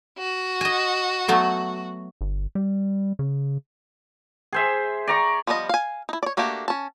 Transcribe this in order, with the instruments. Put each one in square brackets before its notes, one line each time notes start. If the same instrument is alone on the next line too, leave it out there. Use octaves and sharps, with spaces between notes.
[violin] F#4
[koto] D#5 G#5
F#3 A3 B3
[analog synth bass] G1
G3
C#3
[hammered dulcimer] G#4 C5 E5
D5 A#5 C#6
[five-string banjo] F3 G3 B3 D#4 D#5
F5 G#5
D#4 E4
C#5 D5
A3 A#3 D4 F#4 G4
C#4 A5